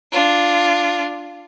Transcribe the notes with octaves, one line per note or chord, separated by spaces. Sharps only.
D4 F4